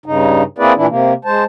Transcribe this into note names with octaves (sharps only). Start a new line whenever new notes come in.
G2 C#3 D#4
A#3 C4 E4 G#4 B4 D5
A#2 E3 D4 E4
C3 A#3
G#3 C5 A5